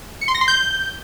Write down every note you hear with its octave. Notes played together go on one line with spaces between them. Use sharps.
C#7
C6
A#6
C6
G6